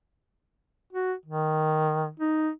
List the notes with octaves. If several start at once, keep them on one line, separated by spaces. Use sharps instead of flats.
F#4
D#3
D#4